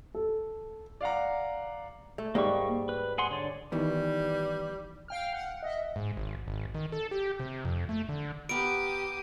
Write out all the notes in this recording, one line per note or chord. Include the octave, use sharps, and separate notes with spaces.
A4
D5 F5 F#5 A#5
A3
G#2 G3 A#3 C#6
B4
G#4 F#5 C6
D3 C#5 D5
D#3 E3 G3 B3
F5 G5 F6
F#5
D#5 E5
G#2
G#1
G#1
D#3
A4
G4
C3
F2
A3
D3
B3 G4 A#4 D#6 D7